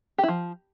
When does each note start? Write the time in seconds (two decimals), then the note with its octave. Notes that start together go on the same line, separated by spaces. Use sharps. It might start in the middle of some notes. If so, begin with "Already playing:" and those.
0.18 G4
0.23 E4
0.28 F3